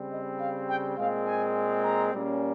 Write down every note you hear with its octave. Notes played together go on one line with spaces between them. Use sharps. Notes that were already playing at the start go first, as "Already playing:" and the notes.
Already playing: C#3 G3 C4
D#5
F5
G5
A#2 G#3 C4 F5
G#5
A#5
A#2 G3 A#3 C#4